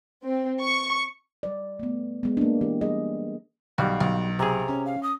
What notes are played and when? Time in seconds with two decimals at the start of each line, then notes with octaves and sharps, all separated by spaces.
0.25 C4
0.61 C#6
1.43 G3 D5
1.79 A3 B3
2.23 G#3 B3
2.37 A#3 D4
2.61 E3 G4
2.81 G3 G#4 D#5
3.78 B1 G3 F#4 F5
4.00 B1
4.39 C3 G#4 A#5
4.68 C#4
4.86 F5
5.03 D#6